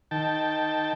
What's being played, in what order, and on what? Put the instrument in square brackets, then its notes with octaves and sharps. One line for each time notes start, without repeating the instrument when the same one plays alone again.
[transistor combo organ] D#3 G5 A5